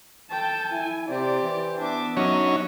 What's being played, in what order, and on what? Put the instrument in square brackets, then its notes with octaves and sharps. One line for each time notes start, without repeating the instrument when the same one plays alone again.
[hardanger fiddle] A4 G5 [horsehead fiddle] A5
[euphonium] E4 [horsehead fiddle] G#5
[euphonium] C3 [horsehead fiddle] E4 D5 [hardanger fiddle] G4 C5
[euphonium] E3
[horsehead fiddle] B3 E5 [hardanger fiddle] D4 D6
[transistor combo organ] F#3 C#4 C#5 [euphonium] D#4 [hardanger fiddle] D#5